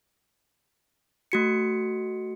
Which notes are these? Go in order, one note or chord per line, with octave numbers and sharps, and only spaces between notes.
A3 F#4 C#7